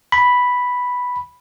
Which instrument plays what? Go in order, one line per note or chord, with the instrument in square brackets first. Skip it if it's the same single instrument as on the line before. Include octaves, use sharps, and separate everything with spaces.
[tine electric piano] B5